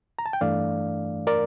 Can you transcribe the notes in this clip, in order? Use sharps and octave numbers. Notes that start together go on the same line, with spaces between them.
A#5
A5
G5
G2 E3 A3 D4 D5 F5
A#4 D5